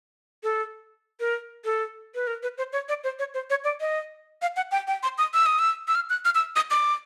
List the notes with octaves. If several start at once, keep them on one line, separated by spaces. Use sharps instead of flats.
A4
A#4
A4
B4
A#4
B4
C5
C#5
D5
C5
C#5
C5
C#5
D5
D#5
F5
F#5
G5
G5
C6
D#6
E6
D#6
E6
E6
F6
F#6
F6
E6
D#6
D6